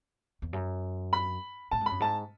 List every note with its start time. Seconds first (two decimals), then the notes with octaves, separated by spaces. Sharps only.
0.42 E2
0.53 F#2
1.13 B5
1.71 A2 A5
1.81 G#2
1.86 B5
1.91 F#2
2.00 G#2 A5